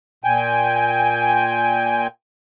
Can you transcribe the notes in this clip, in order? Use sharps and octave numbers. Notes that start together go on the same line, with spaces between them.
A#2 G5 G#5